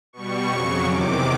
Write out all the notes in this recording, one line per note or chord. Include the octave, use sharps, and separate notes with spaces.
B2 G3 C#6
F2 C#3 F#3 C#6
E2 C3 D#3 D6